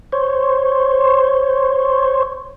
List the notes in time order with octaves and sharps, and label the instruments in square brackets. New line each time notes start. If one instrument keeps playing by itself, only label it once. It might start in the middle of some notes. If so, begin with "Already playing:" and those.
[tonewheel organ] C5 C#5